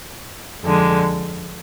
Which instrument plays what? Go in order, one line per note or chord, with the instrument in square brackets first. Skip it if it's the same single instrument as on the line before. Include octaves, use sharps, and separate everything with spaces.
[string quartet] F2 D3 G#3